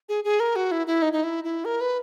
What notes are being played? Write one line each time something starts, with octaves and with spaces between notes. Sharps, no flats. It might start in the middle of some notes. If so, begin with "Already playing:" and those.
G#4
G#4
A#4
F#4
E4
E4
D#4
D#4
E4
E4
A#4
B4